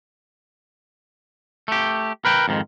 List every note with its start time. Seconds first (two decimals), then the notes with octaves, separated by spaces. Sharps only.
1.68 A3 G4
2.25 A#4 B4 G5
2.48 F2 G#2 D#3